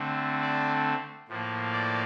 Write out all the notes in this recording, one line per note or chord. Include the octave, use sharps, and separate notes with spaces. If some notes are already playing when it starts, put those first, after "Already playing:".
Already playing: D3 A3 C4
D5
A2 F3 A#3
D5